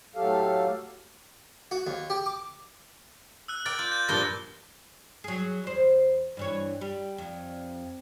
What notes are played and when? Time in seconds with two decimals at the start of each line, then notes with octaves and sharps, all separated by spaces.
0.16 A2 F#3 A3 G4 A4 F5
1.71 F#4
1.87 D#2
2.10 G4
2.26 D6
3.48 E6 F#6
3.66 A#4 D5 G5 A6
3.79 F4 G6
3.92 G6 A6
4.09 G2 A#2 F3 A#6 G7
5.24 F#3 G#4
5.64 E2 C5
6.37 G2 E3 C#5
6.81 G3
7.18 F2